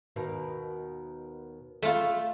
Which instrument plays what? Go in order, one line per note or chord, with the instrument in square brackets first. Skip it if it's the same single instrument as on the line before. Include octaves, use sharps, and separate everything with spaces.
[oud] D#2 B2 D#3
[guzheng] A3 F4